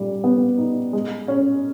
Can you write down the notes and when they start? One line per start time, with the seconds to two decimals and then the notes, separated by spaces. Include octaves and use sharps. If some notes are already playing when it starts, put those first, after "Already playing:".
Already playing: A#2 G3
0.24 B3
0.58 D#4
0.93 G#3
1.28 C#4